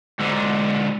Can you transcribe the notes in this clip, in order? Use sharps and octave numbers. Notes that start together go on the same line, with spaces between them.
G#2 D3